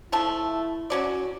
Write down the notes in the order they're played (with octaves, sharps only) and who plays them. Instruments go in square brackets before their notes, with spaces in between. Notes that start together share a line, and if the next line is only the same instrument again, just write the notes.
[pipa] F3 A3 A5 [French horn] E4
[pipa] F#3 C#4 D5 [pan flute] F#4